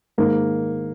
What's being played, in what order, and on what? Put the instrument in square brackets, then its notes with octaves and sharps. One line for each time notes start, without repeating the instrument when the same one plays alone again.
[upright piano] G#2 D#3 G#3 A#3